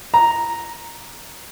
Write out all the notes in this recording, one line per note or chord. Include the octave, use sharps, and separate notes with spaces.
A#5